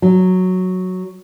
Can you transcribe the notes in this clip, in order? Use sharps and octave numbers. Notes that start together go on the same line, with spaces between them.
F#3